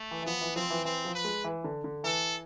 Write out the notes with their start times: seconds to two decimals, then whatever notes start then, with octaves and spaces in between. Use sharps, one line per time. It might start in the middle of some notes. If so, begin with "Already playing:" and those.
Already playing: A3
0.11 E3
0.22 E3
0.26 F3 B3
0.41 E3
0.56 F3 C4
0.70 E3
0.85 E3 C4
1.05 F3
1.15 B4
1.24 G#3
1.44 E3
1.64 D3
1.84 D3
2.04 E3 A4